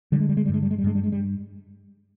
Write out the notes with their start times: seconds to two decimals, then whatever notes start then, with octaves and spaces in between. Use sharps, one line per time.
0.12 D3 G3
0.20 G#3
0.29 G3
0.37 G#3
0.46 G3
0.49 G2
0.54 G#3
0.62 G3
0.71 G#3
0.78 G3
0.84 G2 G#3
0.95 G3
1.04 G#3
1.12 G3